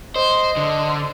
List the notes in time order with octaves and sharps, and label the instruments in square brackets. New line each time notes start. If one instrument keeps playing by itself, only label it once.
[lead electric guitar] C5 [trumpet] D#5
[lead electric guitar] D3